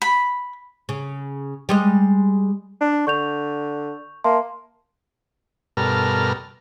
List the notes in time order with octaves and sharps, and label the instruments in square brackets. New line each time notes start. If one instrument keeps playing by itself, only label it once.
[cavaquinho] B5
[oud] C#3
G3 G#3 D#5
[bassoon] D4
[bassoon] D3 [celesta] C#6 G6 F7
[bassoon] A#3 [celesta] E5 A5 C6
[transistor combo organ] G2 B2 A4 A#4 F6